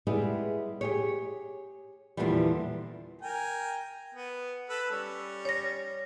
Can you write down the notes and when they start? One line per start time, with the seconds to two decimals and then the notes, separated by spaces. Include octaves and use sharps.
0.07 G3 G#3 B3 E4 G4 G#4
0.81 G4 G#4 C#5
2.17 E2 A#2 D3 E3 F3 G3
3.22 A#4 G5 G#5
4.14 B3
4.69 A4 B4
4.91 G3 C#4
5.45 C#5 A#6